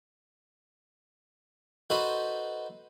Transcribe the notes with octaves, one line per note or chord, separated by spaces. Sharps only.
D#4 F#4 A4 B4 C5